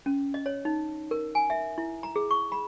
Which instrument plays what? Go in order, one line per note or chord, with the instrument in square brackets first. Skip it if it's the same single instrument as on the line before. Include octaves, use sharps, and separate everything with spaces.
[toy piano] C#4
D#5
C#5
D#4
A#4
G#5
E5
E4
A#5
G#4
C#6
B5